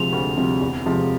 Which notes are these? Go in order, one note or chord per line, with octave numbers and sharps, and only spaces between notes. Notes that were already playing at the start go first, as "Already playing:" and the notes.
Already playing: D2 C3 F3 G#3 C4 F7
D2
C3 F3 G#3 C4
E2
C3 F3 G#3